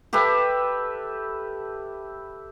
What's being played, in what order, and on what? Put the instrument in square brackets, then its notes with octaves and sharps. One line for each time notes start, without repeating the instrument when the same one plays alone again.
[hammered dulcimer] G4 A4 B4 E5